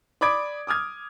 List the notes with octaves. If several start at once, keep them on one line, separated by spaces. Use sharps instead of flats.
D5 B5 D6 D#6 G#6 D7
D6 D#6 F6 G#6